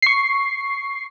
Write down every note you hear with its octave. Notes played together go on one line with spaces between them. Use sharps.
C#6 C7